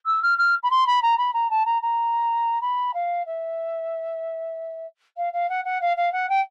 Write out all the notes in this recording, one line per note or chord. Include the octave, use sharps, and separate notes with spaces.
E6
F6
F6
B5
C6
B5
A#5
B5
A#5
A5
A#5
A#5
B5
F5
E5
F5
F5
F#5
F#5
F5
F5
F#5
G5